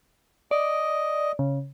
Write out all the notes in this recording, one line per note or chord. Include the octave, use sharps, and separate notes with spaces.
D5 D#5
C#3